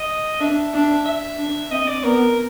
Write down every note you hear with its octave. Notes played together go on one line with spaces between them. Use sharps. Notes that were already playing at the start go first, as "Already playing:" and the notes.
Already playing: D#5
D4 E5
D4
E5
D4
C4 D#5
D5
B3 A#4